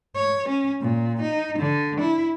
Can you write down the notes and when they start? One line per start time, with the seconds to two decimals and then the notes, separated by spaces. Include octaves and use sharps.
0.16 C#5
0.49 C#4
0.81 A#2
1.22 D#4
1.59 D3
2.01 E4